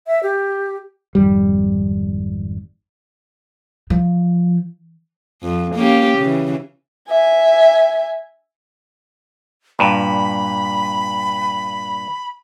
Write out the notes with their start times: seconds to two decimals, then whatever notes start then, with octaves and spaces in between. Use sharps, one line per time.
0.07 E5
0.23 G4
1.15 G#1 F2 G3
3.90 F3
5.43 F2
5.75 A#3 C#4 G4
6.18 C#3 E3
7.10 E5 G#5
9.79 G2 A#2 B5